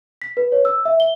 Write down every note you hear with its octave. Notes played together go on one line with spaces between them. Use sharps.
B6
B4
C#5
E6
E5
G7